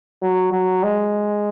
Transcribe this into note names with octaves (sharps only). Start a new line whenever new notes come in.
F#3
F#3
G#3